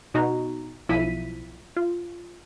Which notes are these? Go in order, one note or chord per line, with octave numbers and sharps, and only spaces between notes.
B2 D#4 F#4 A#5
B1 F3 E4 B6 D#7
F4